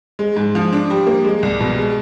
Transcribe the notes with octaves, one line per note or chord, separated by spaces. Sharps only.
G#3
G#2
F3
D4
G3
A#3
G#3
C2
B2
G#3